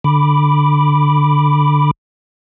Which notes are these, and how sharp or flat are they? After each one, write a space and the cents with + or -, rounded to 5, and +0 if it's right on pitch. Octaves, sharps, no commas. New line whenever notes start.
D3 +5 B5 +0 D6 +0